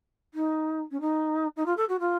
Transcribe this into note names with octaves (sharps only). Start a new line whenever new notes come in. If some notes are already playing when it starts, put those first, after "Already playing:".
D#4
C#4
D#4
D#4
F4
A4
F#4
F4